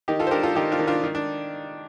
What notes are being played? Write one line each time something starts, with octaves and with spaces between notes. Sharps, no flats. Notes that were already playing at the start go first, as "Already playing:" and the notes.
D#3 D#4 G4
F4 A4
C5
D4 G4 A#4
F4 A4
D#3 D#4 G4
D4 F4
D#3
D4 F4
D#3
D4